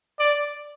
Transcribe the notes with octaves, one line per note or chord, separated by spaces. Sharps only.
D5